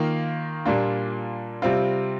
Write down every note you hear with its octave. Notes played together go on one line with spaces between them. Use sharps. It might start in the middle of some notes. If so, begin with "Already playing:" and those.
Already playing: D#3 A#3 F4
A#2 G3 A#3 D4 F4
C3 G3 C4 F4